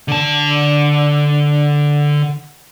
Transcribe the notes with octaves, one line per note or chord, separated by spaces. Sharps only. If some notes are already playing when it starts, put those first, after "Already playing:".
D3 A5